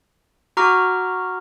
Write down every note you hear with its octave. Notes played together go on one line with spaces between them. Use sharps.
F#4 A#5 C#6 D6 F6